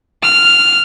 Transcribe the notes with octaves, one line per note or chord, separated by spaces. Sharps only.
F6